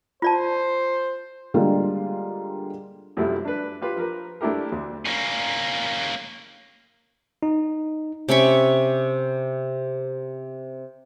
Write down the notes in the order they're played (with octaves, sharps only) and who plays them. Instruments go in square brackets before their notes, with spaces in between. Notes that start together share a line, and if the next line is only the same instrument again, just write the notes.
[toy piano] F4 D5 A5 [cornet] C5
[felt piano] D3 G3 G#3 A#3 D4 F4
[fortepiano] F#2 C3 F3 G3 A3 E4
D4 B4
F4 G4 B4
F3 A#4 B4
A3 D4 E4 G4 A#4
D2
[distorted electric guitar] A#3 C#4
[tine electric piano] D#4
[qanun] C3 C#4 B5 C#6